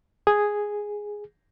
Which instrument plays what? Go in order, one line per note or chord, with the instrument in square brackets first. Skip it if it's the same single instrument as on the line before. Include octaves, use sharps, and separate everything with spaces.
[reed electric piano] G#4